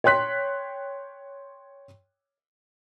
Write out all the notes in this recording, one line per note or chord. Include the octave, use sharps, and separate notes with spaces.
C#5 G5 C6 F#6 B6